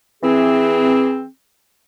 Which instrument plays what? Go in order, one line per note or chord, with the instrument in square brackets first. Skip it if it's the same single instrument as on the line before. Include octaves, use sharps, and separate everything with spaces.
[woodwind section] E3 C4 G#4